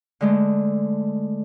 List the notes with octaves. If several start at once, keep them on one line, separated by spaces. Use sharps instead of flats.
D3 G#3 A3